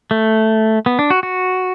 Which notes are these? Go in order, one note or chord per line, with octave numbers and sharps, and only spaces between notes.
A3
B3
D4
F#4
F#4